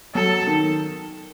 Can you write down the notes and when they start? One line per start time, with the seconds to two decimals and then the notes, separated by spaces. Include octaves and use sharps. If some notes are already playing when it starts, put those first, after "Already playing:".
0.15 F#3 A4
0.47 D#3